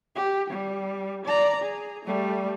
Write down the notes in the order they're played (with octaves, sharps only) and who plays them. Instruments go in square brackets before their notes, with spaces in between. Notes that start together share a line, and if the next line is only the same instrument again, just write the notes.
[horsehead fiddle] G4
G3
D5 A#5
G#4
G3 A3